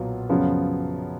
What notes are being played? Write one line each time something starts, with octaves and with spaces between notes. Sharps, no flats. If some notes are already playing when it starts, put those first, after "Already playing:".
Already playing: B1 A#2 F#3 B3 F4
F#2 C#3 F3 B3